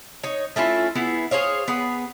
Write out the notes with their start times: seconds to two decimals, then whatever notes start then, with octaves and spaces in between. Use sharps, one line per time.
0.23 D#4 C#5
0.56 A3 C#4 E4 F4
0.95 B3 E4 G#4
1.31 G#4 C5 C#5 F5
1.68 B3 G#4 B4